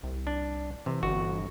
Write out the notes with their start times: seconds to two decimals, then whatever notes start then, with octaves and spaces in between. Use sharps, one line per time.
0.03 C2
0.27 D4
0.86 C3 E3
1.03 G1 F#4